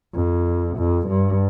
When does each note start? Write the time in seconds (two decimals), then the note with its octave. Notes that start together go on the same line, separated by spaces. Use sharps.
0.14 F2
0.77 F2
1.08 G2